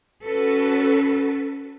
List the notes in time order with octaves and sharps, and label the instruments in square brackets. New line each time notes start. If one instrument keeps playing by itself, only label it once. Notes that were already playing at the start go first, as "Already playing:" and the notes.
[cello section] C#4 F#4 A4 B4